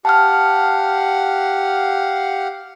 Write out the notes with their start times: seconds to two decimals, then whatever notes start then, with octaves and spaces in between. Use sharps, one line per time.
0.05 G4 F5 F#5 A5 F6